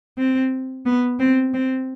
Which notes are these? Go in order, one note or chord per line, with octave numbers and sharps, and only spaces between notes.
C4
B3
C4
C4